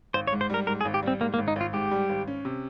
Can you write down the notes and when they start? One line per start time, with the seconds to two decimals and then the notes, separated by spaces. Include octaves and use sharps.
0.14 G#1 C5
0.27 C#5
0.33 G#2
0.41 C5
0.50 G3 A#4
0.67 G#2 A#4
0.81 G#4
0.85 G#1
0.94 G4
1.03 G3 C4
1.21 G#2 A#3
1.34 A#3
1.38 G#1
1.48 D#4
1.56 G#1 F4
1.73 G#2 G4
1.91 G3
2.09 G#1
2.28 C#4
2.45 C3